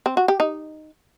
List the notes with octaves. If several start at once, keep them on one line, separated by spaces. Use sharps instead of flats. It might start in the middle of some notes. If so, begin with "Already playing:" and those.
C4
F#4
G4
D#4